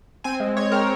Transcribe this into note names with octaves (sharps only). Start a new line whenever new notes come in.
C4 G#5
G#3
G#3 C#5
C4 A#4